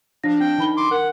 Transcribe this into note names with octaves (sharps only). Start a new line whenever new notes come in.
F3 D4 F5 A#6
C4 D4 G5
D#3 D#4 B5 G7
C6 D6
A#4 F#5